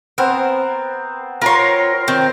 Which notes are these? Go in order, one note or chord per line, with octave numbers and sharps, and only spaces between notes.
B3 C4 A#4
F4 A#4 C#5 A#5 C6
D#3 C4